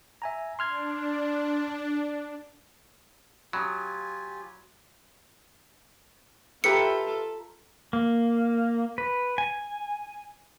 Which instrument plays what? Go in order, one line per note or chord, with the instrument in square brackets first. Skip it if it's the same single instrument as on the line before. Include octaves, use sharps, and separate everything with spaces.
[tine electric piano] E5 G#5 A#5
[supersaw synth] D4 [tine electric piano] C6 F6 G#6
[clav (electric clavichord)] F#3 [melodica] F4 G4 G#5 [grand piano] B5 D#6
[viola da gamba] F4 A4 [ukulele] G4 B4 E5 [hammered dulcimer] A#5 B5 [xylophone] C#7
[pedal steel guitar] A#3
B4
G#5